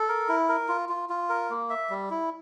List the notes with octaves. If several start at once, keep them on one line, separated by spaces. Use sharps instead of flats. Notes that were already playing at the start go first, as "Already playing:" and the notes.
Already playing: A4
A#4
E4
A#4
F4
F4
F4
A#4
A#3
E5
G3
E4